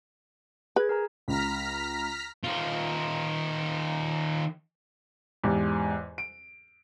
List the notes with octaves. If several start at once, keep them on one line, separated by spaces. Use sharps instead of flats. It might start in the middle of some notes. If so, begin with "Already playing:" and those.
G#4 B4 G#6
A#4 G#5 A#5
C#2 A#5 F6 B6
D#3 F4
E2 G#2 G4
D7